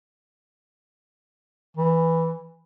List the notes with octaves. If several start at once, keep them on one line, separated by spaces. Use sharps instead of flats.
E3